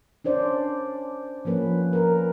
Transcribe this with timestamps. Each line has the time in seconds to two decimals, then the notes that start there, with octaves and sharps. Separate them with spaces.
0.24 C#4 D4 C5 D5
1.45 F3 A#3 C#4 B4
1.93 A#4 B4